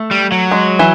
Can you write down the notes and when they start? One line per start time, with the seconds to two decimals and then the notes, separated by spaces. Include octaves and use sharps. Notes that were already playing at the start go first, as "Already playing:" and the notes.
Already playing: A3
0.11 G3
0.32 F#3
0.51 G#3
0.79 E3